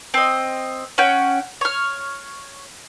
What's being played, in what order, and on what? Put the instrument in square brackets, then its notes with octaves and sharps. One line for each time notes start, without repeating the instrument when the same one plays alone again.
[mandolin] C4 D#5
C#4 F#5 G5
C#5 F6